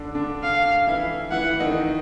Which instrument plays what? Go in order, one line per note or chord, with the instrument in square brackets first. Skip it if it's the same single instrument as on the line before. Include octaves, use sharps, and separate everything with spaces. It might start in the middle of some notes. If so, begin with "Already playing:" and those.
Already playing: [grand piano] D3 D4
D3 D4
[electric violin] F5
[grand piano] E3 E4
[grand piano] E3 E4 [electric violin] F#5
[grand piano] D#3 D#4